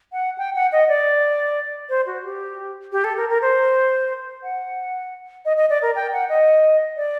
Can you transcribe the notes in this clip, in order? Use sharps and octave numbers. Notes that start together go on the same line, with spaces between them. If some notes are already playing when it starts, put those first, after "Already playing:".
F#5
G5
F#5
D#5
D5
C5
F#4
G4
G4
A4
A#4
A#4
C5
F#5
D#5
D#5
D5
A#4
G5
F#5
D#5
D5